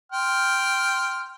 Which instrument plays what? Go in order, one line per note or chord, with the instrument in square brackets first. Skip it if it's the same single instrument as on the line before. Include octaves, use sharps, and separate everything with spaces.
[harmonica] G5 C6 F6